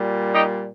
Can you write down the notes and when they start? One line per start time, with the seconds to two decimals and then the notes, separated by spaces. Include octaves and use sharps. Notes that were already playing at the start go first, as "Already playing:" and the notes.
Already playing: A#2 G3
0.34 D#4 G4